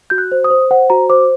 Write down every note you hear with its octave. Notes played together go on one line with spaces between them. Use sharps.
F#4 G6
F#6
C5
D#6
C5
C5 F#5
F#4 A#5
C5 D6